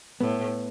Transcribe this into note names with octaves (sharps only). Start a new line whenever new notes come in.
A2 B3